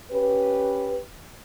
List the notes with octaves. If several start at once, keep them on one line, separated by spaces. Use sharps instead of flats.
C#4 G4 B4